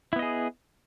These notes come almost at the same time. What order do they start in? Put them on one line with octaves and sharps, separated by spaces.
E4 B3 D#5 G#4